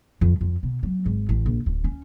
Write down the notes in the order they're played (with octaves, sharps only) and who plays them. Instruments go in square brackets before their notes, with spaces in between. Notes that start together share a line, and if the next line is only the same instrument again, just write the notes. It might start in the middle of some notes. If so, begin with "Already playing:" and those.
[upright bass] F2
F2
B2
F#3
G#1
A1
A#1
D1
C#4